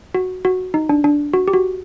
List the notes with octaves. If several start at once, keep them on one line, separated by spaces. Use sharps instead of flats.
F#4
F#4
D#4
D4
D4
F#4
G4
F#4